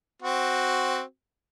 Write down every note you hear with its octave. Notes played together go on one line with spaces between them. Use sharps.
C4 F#4